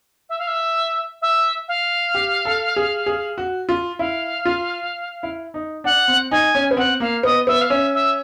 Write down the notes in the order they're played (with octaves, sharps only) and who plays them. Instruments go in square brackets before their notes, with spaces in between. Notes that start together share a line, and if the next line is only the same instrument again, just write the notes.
[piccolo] E5
F5
E5
E5
F5
[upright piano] G4
A4
G#4
G#4
F#4
F4
[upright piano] E4 [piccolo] F5
[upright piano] F4
E4
D#4
[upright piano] D4 [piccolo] F#5
[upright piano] C4
[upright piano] D#4 [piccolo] G#5
[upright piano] C#4
B3
[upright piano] C4 [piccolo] F#5
[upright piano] A#3 [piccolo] F5
[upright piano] B3 [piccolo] D#5
[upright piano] B3 [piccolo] E5
[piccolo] F5
[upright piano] C#4 [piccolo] E5
[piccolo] E5